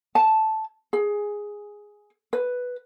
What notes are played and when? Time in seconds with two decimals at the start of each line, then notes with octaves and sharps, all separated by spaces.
0.15 A5
0.93 G#4
2.33 B4